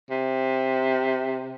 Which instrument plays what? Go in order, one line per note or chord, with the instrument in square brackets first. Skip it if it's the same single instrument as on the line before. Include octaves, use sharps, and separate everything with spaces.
[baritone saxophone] C3